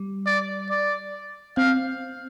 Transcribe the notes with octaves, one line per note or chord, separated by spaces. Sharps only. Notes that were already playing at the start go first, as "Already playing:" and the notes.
Already playing: G3
D5
D5
C4 F5